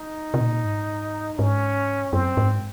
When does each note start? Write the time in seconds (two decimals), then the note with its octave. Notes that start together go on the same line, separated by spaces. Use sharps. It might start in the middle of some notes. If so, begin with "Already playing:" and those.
Already playing: D#4
0.34 C3
0.40 A#2
0.65 G#2
1.38 G#2 C#4
2.12 F#2 C4
2.37 G#2